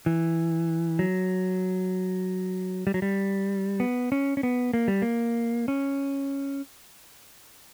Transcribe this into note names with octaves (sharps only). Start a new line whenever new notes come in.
E3
F#3
G3
F#3
G3
B3
C#4
C#4
B3
A#3
G3
A#3
C#4